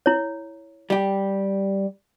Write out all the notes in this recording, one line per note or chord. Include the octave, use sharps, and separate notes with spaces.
E4 C#5
G3 G4